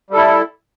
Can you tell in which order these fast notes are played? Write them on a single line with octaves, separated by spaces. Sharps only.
G3 A4 E4